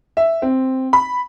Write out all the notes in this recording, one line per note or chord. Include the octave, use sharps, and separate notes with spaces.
E5
C4
B5